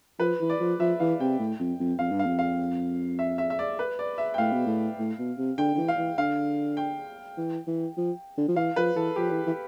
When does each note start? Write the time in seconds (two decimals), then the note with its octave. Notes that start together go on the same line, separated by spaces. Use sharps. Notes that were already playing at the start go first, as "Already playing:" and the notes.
0.20 F3 B4
0.41 E3
0.50 D5
0.60 F3
0.79 F3 E5
1.00 E3 F5
1.20 C3 G5
1.39 A2
1.60 F2
1.80 F2
1.99 F2 F5
2.12 G2
2.19 F5
2.26 F2
2.39 F5
3.19 E5
3.38 E5
3.50 E5
3.59 D5
3.79 B4
3.99 D5
4.18 E5
4.34 G5
4.38 A2 F5
4.52 B2
4.66 A2
4.99 A2
5.19 B2
5.38 C3
5.58 D3 G5
5.74 D3
5.77 E3
5.88 F5
5.98 E3
6.18 D3 F5
6.77 G5
7.37 E3
7.67 E3
7.97 F3
8.37 D3
8.48 F3
8.56 E3 F5
8.76 F3 B4
8.96 E3 A4
9.16 F3 G4
9.31 E3
9.46 E3